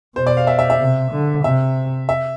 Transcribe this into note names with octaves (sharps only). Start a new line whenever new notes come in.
B2 C5
D5
F5
E5
E5
E5
C3
D3
C3 E5
E5